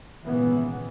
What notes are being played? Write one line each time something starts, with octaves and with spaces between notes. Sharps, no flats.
G#1 A#2 C#3 E3 B3